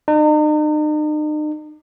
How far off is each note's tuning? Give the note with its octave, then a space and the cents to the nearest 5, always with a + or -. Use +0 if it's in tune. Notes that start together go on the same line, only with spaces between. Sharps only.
D#4 -40